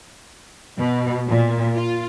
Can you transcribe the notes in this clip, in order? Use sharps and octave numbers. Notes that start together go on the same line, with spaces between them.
B2
A#2
F4